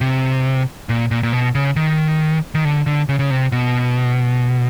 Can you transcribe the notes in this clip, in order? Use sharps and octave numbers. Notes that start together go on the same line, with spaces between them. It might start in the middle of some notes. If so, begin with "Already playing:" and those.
C3
A#2
A#2
A#2
B2
C#3
D#3
D#3
D3
D3
C#3
C#3
C3
B2